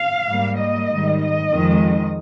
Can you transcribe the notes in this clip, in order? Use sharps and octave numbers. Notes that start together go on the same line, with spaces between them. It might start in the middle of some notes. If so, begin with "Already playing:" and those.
Already playing: F5
G#2 G3 A#3
D#5
G#2 D#3 G3
D#5
F2 D#3 G#3